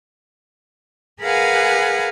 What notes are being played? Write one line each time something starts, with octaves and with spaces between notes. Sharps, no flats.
G#4 A#4 B4 F5 F#5 G#5